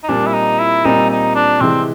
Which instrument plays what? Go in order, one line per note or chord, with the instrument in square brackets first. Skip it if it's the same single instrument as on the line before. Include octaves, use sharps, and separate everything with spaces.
[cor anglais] D#4
[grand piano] A#2 G3 C4 [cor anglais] D4
[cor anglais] E4
D#4
E4
[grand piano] A#2 G3 C4 [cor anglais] D#4
[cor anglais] D#4
D4
[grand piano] C3 E3 G#3 [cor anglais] C4